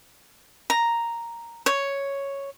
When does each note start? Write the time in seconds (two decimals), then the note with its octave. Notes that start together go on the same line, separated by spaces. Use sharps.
0.70 A#5
1.66 C#5